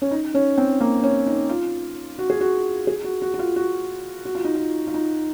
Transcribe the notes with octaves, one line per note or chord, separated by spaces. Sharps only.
C#4
D#4
C#4
C4
A#3
C#4
D#4
F4
F#4
G#4
F#4
G#4
F#4
F#4
F#4
F4
F#4
F#4
F4
D#4
F4
F4
D#4